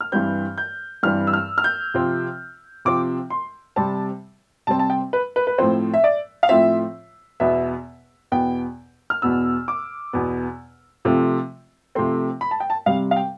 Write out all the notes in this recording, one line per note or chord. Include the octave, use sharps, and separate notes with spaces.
F6
G2 E3 G3 C4 G6
G6
G2 E3 G3 C4 F6
E6
F6
F6
G6
C3 F3 C4
C3 F3 C4 D6
C6
C3 G3 C4 A5
C3 G3 C4 A5
A5
G5
B4
B4
B4
A2 F3 C4 C5
E5
D5
F5
A2 F3 C4 E5
E2 B2 B3 E5
E2 B2 B3 G5
F6
E2 B2 B3 E6
D6
E2 B2 B3
C3 F3 A3 C4
C3 F3 A3 C4 C6
B5
A5
G5
A5
C3 G3 C4 F5
F5
G5